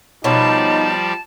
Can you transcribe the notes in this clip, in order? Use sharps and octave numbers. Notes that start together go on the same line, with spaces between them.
B2 F3 G3 D#4 F4 C#5 D5 A5